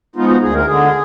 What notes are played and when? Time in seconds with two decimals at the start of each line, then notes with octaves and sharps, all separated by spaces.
0.16 F3 G#3 B3 D#4 F4
0.29 F#4
0.42 D2 G#4
0.54 A#4
0.66 D3 G#3 G#4